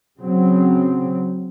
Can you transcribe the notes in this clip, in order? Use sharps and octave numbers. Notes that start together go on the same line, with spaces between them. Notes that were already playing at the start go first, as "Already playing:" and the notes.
C#3 F#3 C4